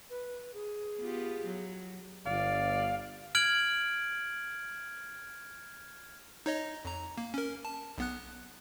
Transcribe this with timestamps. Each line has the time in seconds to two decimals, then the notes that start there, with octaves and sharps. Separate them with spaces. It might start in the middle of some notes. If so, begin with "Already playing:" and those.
0.10 B4
0.54 G#4
1.00 B3 F4 G4
1.46 F#3
2.26 G1 D5 F5
3.35 F6 G#6 D7 F#7
6.46 D#4 C#5 D#5
6.85 F2 A#5
7.18 A#3
7.34 C#4 A#4
7.65 A5
7.98 B1 B3 F#6